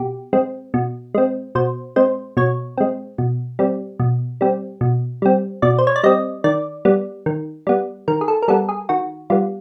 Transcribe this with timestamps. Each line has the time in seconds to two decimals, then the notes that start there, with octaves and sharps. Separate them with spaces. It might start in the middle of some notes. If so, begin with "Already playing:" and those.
Already playing: B2 G4
0.33 G#3 C4
0.74 B2
1.14 G#3 C4
1.55 B2 C5
1.96 G#3 C4 C5
2.37 B2 C#5
2.78 G#3 C4
3.18 B2
3.59 G3 C4
3.99 B2
4.41 G3 C4
4.81 B2
5.22 G3 C4
5.62 B2 D5
5.78 C5
5.87 C#5
5.96 D5
6.03 G3 C4 D#5
6.44 D#3 D5
6.85 G3 B3
7.26 D#3
7.67 G3 B3
8.08 D#3 A#4
8.21 G#4
8.28 A4
8.42 A#4
8.48 G3 B3 A4
8.69 G#4
8.89 D#3 F#4
9.30 G3 B3 F4